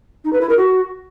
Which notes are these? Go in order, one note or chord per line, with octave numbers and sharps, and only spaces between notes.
D#4
B4
E4
A#4
F#4